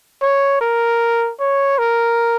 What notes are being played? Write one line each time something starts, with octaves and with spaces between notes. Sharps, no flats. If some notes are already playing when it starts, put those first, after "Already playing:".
C#5
A#4
C#5
A#4